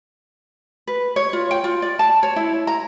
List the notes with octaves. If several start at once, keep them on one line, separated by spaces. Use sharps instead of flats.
B4
C#5
F4
G5
F4
D5
A5
C#5
E4
A#5